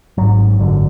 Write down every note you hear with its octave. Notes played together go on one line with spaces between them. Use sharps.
G#1 G#2 F#3
G#1 F#2 D3